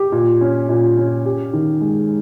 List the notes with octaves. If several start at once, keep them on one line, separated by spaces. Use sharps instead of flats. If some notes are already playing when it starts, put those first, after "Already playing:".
Already playing: G4
A#2
C#4
A#2
C#4
G4
D#3
G#3